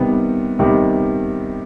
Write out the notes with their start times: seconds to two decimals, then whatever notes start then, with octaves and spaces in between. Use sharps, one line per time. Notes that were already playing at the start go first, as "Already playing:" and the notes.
Already playing: C3 D#3 G3 B3
0.59 C3 D#3 G3 B3